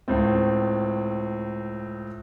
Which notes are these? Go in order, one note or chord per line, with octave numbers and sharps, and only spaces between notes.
C#2 A2 C4